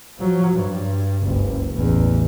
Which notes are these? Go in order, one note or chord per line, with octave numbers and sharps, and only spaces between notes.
F3 F#3
G2
F#1 C#2
A1 E2